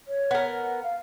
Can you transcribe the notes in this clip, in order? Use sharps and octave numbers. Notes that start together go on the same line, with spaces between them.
C#5
B3 A#4
F#5
F5